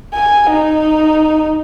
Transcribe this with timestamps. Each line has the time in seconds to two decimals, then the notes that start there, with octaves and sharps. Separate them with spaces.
0.14 G#5
0.50 D#4